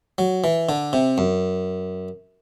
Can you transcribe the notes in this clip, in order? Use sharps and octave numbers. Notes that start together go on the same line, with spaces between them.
F#3
E3
D3
C3
F#2